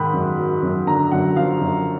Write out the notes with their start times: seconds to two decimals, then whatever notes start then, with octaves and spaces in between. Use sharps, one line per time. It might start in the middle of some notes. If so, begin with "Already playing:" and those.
Already playing: G#2 D#3 B5
0.13 F#2
0.38 F#3
0.62 F#2
0.87 D3 A#5
1.11 F#2 F#5
1.36 F3 F5
1.61 F#2